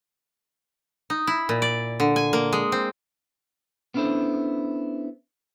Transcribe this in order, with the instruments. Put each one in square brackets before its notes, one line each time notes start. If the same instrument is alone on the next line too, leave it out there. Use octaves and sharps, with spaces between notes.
[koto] D#4
E4
A#2
D5
D3
G#5
A#3
G#3
C4
[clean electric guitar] B3 C#4 D4 E4 A4 C5